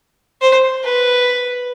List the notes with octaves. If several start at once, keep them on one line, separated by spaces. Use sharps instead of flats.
C5
B4